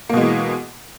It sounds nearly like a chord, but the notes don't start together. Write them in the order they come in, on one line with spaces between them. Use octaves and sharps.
A#3 B2 G#3 E3